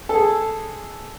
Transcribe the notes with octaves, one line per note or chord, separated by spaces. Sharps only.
G#4 A4